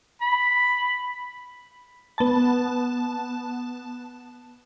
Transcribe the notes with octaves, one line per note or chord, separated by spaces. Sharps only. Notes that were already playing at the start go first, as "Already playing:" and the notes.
B5
B3 A5